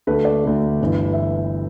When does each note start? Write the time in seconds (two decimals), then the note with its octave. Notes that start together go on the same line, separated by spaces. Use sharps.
0.07 D2 D3 A3 B4
0.25 D5
0.44 D2 D3 A3
0.81 G1 G2 E3
1.13 E5